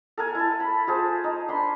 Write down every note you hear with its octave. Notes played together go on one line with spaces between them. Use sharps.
A4 A#4 G#5
E4 A5
B5
F4 G#4 C5 A5
D#4
D4 B5 C6